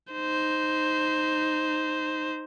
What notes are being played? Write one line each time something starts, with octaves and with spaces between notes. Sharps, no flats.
D#4 C5